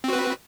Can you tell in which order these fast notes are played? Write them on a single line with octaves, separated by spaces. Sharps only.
C4 F#4 B4